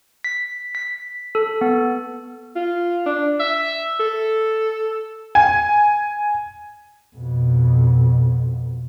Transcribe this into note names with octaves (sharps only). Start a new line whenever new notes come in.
B6
B6
A4
B3
F4
D4
E5
A4
G#5
F2 B2